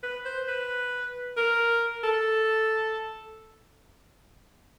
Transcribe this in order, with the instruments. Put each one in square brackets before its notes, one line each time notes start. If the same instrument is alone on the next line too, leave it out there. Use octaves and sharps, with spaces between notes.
[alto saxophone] B4
C5
B4
A#4
A4